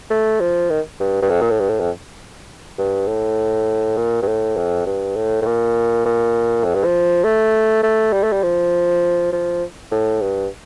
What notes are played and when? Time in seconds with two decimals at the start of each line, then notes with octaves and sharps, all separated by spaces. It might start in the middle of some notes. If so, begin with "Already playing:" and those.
0.11 A3
0.40 F3
0.70 D#3
1.00 G2
1.22 G2
1.30 F2
1.41 A#2
1.51 A2
1.60 G2
1.69 A2
1.80 F2
2.78 G2
3.08 A2
3.97 A#2
4.22 G2
4.28 A2
4.56 F2
4.86 G2
5.16 A2
5.42 A2
5.46 A#2
6.06 A#2
6.64 F2
6.75 G2
6.85 F3
7.24 A3
7.83 A3
8.13 G3
8.23 A3
8.33 G3
8.43 F3
9.33 F3
9.92 A2
10.22 G2